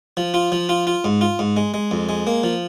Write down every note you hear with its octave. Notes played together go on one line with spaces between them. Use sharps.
F3
F4
F3
F4
F4
G#2
F4
G#2
G#3
G#3
F2
G#3
A#3
F3